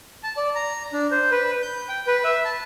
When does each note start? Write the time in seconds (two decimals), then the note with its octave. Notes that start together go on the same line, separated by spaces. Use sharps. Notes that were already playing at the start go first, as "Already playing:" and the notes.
0.23 A5
0.37 D5
0.55 A#5
0.93 D4
1.11 C5
1.31 B4
1.62 G6
1.89 G5
2.07 B4
2.24 E5
2.45 A5